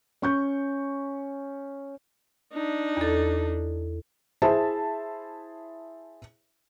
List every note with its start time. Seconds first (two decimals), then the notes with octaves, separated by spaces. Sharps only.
0.22 C#4 C#6 G6
2.53 D4 D#4
2.97 E2 A4
4.42 E4 G#4 C5 E5 A5